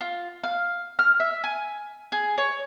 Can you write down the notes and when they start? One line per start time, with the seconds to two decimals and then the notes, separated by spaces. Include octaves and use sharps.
0.01 F4
0.43 F5
0.99 F6
1.20 E5
1.44 G#5
2.12 G#4
2.38 C#5